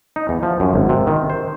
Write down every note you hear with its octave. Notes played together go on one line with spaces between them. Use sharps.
D#4
E2
F3
F#2
G#1
C3
D#3
C5